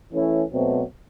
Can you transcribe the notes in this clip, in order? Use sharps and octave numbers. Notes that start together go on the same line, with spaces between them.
E3 A3 C#4 E4
B2 F#3 A3 C4